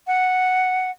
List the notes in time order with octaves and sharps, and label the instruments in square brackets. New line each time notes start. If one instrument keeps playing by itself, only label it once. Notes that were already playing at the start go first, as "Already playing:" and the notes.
[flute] F#5